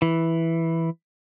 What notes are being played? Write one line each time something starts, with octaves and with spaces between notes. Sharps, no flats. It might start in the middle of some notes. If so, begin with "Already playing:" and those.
E3